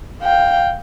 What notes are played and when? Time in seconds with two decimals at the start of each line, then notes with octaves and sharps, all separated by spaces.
0.22 F5 G5